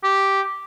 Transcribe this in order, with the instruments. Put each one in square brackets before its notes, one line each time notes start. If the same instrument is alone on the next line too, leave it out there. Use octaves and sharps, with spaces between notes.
[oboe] G4